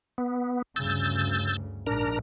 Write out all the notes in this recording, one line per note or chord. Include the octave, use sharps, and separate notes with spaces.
B3
D2 G2 C#3 E6 G6 A6
A#1 G#2 D4 A#4 A#5